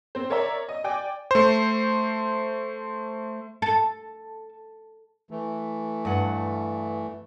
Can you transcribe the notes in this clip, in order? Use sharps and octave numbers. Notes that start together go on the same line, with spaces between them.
C4 C5
A#4 C#5 D5 E5 A#5
D#5
D5 G5 G#5 D6
A3 C5
A4
E3 A3
G2 F#5